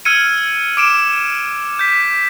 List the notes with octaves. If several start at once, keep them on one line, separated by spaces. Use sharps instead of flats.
E6 F6 G#6 C#7 D#7
D6 D7 E7
G6 B6